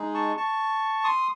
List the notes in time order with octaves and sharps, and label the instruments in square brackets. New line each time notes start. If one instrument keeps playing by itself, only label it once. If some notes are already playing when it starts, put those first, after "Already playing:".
Already playing: [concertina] G#3 D#4 G#4
A5 C#6
A5 C#6
C6 D#6